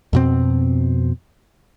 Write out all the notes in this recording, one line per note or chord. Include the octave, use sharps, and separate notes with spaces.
F2 B2 C4